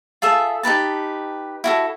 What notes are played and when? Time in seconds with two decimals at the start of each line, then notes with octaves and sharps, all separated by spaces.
0.22 F4 G#4 A4 E5
0.63 D#4 G4 B4 A5
1.64 E4 F#4 A4